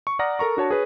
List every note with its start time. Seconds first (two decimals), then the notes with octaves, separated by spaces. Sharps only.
0.07 C#6
0.19 D5 F#5 A#5 D#6 F6 A#6
0.39 A4 A#4 A#5 C#6
0.57 D4 F#4 C#5 A5
0.70 G#4 B4 C#5